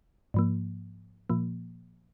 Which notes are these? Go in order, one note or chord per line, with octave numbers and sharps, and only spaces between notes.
G#2 F3 A#3
A#2 F3 A#3